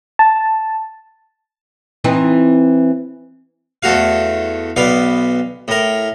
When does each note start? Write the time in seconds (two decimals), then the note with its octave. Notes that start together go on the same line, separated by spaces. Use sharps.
0.19 A5
2.04 E3 C4 D#4
3.83 E2 A3 F#4 F5
4.76 B1 B3 D5 F5
5.68 A2 A#4